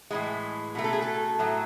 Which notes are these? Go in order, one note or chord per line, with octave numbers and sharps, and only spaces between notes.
A2 E3 G#3
B2 F#3 A3
A4
G#4
A4
A2 F#3 A3